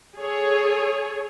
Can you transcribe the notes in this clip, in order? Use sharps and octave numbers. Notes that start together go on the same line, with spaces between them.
G#4 A4 C#5